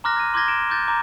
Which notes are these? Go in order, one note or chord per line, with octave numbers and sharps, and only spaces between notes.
A#5 C6 D6 F6 F#6 A#6
G#6 A#6 D#7
C6 D6 G6 G#6 A#6 G7
D7 E7
D6 F#6 G6 A6
A#5 D6